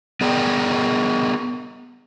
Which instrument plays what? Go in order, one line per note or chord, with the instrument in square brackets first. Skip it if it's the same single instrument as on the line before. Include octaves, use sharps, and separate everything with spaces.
[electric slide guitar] B3 G#4 A#4 D5 G5